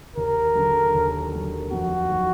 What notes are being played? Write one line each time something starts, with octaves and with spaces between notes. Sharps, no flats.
D#2 A#4
D3 F#3
D#2
D3 F#3
F2 F#4
D#3 F#3